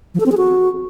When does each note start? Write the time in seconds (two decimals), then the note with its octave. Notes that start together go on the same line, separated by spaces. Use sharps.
0.14 F3
0.20 A4
0.26 C4
0.32 G#4
0.37 F#4